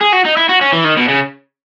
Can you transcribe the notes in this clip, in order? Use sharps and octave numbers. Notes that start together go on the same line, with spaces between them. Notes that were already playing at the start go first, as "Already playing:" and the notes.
G#4
F#4
D#4
E4
F#4
C#4
E3
D#3
B2
C#3